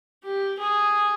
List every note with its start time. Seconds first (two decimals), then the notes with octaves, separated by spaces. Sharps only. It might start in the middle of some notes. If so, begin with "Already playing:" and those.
0.24 G4
0.58 G#4